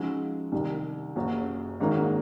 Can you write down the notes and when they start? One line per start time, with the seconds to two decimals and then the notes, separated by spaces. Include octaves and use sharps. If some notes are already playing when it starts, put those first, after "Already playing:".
Already playing: C#3 F3 G#3 D#4 F#4
0.52 C2 C3 D#3
1.16 F#1 F#2 C#3 F#3
1.80 G#1 G#2 D#3 F#3 A#3